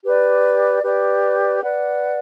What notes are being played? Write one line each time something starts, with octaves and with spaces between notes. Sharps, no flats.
G4 B4 D5
G4 B4 D5
B4 D5 F#5